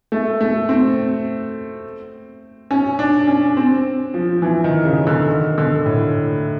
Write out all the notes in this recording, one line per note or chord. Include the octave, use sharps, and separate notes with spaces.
A3
A3
C4
C#4
D4
C#4
C4
F3
E3
D#3
C#3
D3
D#3
D3
A2